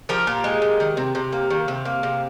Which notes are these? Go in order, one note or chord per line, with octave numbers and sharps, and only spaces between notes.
F3 G4 A#4
A#2
G#3
A#2
D#3
C3
C3
A#3
D#3
C3
A#3
C3